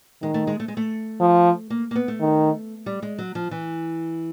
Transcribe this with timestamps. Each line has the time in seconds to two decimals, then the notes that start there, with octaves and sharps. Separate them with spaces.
0.22 D#3 G#3
0.34 A3
0.47 G#3
0.60 A3
0.68 G#3
0.77 A3
1.21 F3
1.70 A#3
1.91 A#3
1.95 B3
2.08 A3
2.20 D#3
2.86 G3
3.03 G#3
3.18 F#3
3.35 F3
3.51 E3